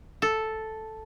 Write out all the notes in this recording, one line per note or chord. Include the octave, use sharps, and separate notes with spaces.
A4